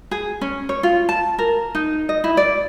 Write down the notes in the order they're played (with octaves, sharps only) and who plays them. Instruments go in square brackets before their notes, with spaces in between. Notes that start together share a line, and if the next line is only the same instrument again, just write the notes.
[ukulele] G#4
C#4
C#5
F4
A5
A#4
D#4
D#5
E4
D5